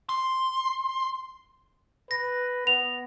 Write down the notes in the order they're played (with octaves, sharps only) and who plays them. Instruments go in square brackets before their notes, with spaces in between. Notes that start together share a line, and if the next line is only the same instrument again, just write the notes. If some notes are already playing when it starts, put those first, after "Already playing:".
[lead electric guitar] C6
[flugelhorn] B4 [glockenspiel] A#6
[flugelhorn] B3 [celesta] F7